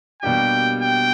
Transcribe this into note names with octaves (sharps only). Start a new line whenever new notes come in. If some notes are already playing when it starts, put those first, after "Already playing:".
B2 G3 A#3 D4 G4 G5
G5